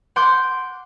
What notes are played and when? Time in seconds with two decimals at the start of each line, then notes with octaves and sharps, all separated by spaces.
0.16 F#5 C6 D6 G6